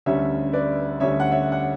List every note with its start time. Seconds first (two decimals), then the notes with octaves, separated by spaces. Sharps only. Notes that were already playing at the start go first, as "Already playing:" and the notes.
0.06 D2 D3 G3 C#4 C#5 E5
0.53 B4 D5
1.00 D2 D3 G3 C#4 C#5 E5
1.20 F#5
1.32 C#5 E5
1.52 F#5